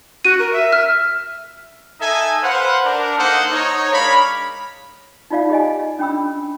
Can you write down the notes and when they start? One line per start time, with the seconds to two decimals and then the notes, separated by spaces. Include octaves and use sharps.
0.25 F#4 D#7
0.39 A#4
0.53 E5
0.72 F6
2.00 D#4 A4 D#5 E5 G#5
2.43 B4 C5 F5 F#5
2.85 D4 A#4
3.18 A#3 D#4 A4 C5 D#5 F#5
3.52 D#4 C#5
3.92 G#3 D4 A#4 C#5 F5 B5
5.30 D#4 F4 D5 F5
5.50 G4 D#5 G#5
5.99 C#4 D4 G5 B5 E6